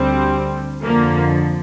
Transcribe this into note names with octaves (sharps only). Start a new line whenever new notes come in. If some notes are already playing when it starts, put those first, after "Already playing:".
Already playing: D2 D3 G3 C4
F2 D3 F3 A#3